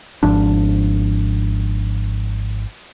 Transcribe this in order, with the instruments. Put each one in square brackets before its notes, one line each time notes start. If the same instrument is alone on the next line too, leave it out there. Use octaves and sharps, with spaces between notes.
[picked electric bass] G#1 G#2 F3 D4